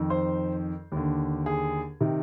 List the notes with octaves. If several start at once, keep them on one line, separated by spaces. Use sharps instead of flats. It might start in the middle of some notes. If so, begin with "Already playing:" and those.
Already playing: F2 D#3
C5
D#2 D3
G#4
C3 D#3